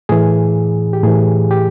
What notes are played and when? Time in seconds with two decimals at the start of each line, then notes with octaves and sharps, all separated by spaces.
0.09 A2 E3 G#4
0.93 G4
1.03 A2 E3 G#4
1.51 G4